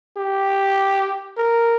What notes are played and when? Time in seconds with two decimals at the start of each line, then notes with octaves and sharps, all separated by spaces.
0.18 G4
1.38 A#4